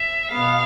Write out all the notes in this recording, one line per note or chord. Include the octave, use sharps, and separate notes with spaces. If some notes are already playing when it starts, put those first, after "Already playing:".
Already playing: E5
B2 B3 F5